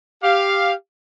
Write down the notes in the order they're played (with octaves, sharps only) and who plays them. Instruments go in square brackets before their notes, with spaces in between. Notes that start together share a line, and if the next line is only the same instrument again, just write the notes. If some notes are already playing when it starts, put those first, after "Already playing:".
[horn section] G4 F5